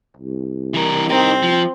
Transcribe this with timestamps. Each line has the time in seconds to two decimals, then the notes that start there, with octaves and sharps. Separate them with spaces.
0.17 C2
0.74 E3 A#4
1.10 C4 D#4 A#4
1.43 F3